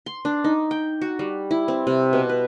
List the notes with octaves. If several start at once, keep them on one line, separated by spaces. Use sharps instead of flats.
C6
D4
D#4
G5
F#4
G3
E4
C4
C3
B2
B4